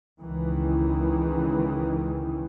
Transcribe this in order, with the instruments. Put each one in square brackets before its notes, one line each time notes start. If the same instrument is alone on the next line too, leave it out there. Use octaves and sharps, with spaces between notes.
[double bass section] C#2 D#3 E3